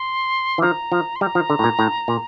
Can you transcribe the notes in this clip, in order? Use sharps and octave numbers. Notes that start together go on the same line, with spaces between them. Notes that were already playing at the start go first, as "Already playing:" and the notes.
Already playing: C6
E3
F3 A#5
F3
C6
G3 A#5
F3
D3
A2
A#2
A2
A#2